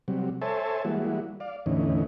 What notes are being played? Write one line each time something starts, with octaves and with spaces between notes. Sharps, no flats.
C3 F#3 G3
A4 C5 C#5 E5 G#5 A5
E3 G3 G#3 A#3 E4 F#4
D5 F5
E2 A2 D3 E3 C#4 D#4